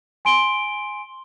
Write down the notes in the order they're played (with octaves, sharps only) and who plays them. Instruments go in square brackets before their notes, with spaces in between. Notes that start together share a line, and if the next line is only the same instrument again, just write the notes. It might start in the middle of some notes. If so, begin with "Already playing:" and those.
[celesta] G#5 C6 D7 G7